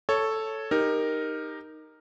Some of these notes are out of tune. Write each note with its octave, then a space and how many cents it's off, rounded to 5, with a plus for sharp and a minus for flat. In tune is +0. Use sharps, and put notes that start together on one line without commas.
A4 +0 C#5 +0
D#4 +0 G4 +20 A#4 +0